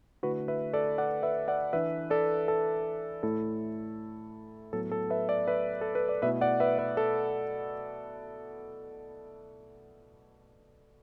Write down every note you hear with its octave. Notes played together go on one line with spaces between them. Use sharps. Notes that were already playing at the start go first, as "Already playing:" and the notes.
D3 A3 E4 F#4 B4
B4 E5
A4 D5
D5 F#5
B4 E5
D5 F#5
E3 D4 B4 E5
A4 D5
A4
A2 A3 E4 A4
A2 F#3 B3 E4 A4
A4
B4 E5
A4 D5
B4 E5
A4
B4
D5
B2 A3 E4 B4 E5
D5 F#5
B4 E5
B4 E5
A4